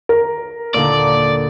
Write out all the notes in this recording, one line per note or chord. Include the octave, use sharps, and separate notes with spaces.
A#4
D#2 A#2 D3 D5